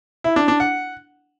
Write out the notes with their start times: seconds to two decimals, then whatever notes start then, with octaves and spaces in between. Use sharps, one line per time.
0.24 E4
0.36 D4
0.48 D4
0.60 F#5